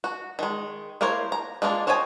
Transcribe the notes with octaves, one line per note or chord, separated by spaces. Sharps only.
F#4
D#3 G#3
A#3 E4 A#4 C5 C#5
A#5
G#3 A#3 D4 F4
C5 C#5 D#5 G5 G#5